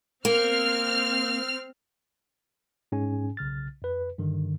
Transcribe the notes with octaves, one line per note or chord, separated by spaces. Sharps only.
A#3 C4 F6
G#2 C#4 G#4 G#5
B1 C#3 F6 A6
F2 B4
G2 D3 D#3